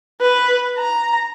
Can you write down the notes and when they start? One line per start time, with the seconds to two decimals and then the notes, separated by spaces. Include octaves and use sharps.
0.21 B4
0.78 A#5